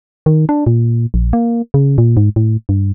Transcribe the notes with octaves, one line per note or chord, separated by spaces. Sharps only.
D#3
D4
A#2
A#1
A#3
C#3
A#2
G#2
A2
G2